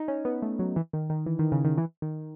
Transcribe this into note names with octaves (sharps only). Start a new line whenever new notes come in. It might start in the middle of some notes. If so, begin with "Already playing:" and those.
Already playing: D#4
C#4
B3
A3
F#3
E3
D#3
D#3
E3
D#3
C#3
D#3
E3
D#3